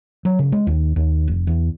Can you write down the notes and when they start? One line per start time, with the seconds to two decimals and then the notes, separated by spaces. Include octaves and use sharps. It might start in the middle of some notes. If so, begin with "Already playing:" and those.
0.25 F#3
0.39 C#3
0.52 G#3
0.67 D#2
0.96 D#2
1.28 F1
1.47 E2